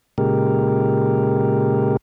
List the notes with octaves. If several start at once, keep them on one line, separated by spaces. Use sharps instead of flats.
A#2 C#3 G#3 G4 A#4